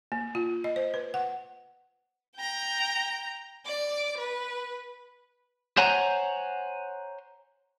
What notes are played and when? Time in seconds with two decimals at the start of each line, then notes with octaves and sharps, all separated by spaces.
0.12 A#3
0.35 F4
0.64 D#5
0.76 C5
0.94 B4
1.14 F#5
2.36 G5 A#5
3.65 D5 D6
4.17 B4
5.77 C5 C#5 F#5 G#5 A#5